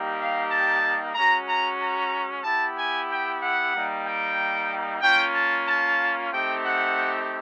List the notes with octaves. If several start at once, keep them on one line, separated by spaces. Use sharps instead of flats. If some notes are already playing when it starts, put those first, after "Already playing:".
Already playing: G3 A#3 D#4 G4
F5
A5
G#3 C#4 F#4 A#5
A#5
A#5
B3 E4 G4 A5
G#5
G5
F#5
G3 A#3 D#4
G5
A#3 C#4 F4 G5
A5
A5
A3 C4 D#4 G4 G5
F#5